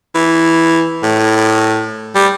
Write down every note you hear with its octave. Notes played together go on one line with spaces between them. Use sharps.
E3
A2
G3